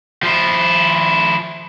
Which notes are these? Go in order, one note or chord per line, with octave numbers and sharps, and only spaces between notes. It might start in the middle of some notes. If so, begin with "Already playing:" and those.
F3 E4